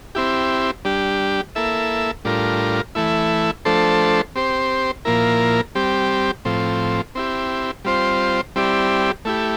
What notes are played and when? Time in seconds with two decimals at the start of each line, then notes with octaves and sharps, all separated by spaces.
0.15 C4 E4 G4
0.85 G3 D4 G4
1.55 A#3 E4 A4 E5
2.25 A2 G3 D4 F4 A#4
2.95 E3 A3 E4
3.65 F3 A3 D4 A4 C5
4.35 C4 G4 C5
5.05 A#2 F3 A#3 E4 A#4
5.75 G3 C4 G4
6.45 A2 F3 C4
7.15 C4 E4 G4
7.85 G3 C4 F4 C5
8.56 G3 C4 E4 G4 D5
9.25 A3 E4 G4